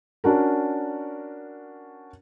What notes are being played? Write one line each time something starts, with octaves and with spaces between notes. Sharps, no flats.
C#4 D4 F#4 A#4